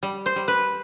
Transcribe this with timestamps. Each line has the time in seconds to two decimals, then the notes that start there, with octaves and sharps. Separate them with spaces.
0.03 G3
0.26 C5
0.36 G3
0.48 B4